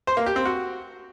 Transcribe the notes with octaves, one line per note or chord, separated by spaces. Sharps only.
C5
A#3
G4
C4
F#4